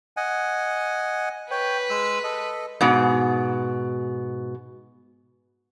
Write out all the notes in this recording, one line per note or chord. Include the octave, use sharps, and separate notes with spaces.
D#5 F#5 G#5
B4 C#5 G5
G#3 E6
A4 D#5
G#2 B2